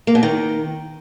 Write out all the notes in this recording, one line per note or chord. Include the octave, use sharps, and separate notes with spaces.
A#3
B2
D#3